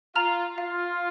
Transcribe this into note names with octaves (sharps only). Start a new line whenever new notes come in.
F4 A#5 F6
F4 F5